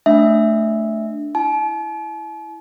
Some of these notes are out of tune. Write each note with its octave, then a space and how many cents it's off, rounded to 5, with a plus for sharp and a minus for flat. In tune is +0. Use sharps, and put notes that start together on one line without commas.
A3 +0 D4 +0 E5 +0
E4 +0 A5 -45